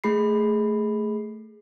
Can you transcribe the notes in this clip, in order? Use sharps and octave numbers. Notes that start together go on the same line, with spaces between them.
A3 G#4 B5 C7